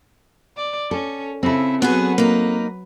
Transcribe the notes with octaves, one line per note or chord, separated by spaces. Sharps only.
D5
C#4 A4
C#3 C4 E4 A4
F#3 B3 F#4 G#4 B4
A#3 D#4